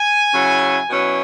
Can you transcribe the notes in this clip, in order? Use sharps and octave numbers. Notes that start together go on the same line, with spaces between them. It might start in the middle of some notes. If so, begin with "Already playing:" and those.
Already playing: G#5
C#3 F#3 C#4 E4
B2 F#3 C#4 E4